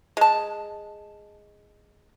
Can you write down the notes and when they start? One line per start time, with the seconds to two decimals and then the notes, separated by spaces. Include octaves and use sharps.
0.17 G#3 A5